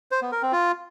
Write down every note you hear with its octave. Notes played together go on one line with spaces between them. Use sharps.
C5
B3
A#4
C4
F4